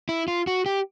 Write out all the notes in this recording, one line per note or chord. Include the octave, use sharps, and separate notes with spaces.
E4
F4
F#4
G4